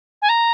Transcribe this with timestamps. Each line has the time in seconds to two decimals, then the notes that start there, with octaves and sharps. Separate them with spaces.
0.22 G#5
0.29 A#5